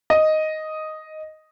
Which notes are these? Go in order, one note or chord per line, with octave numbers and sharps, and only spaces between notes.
D#5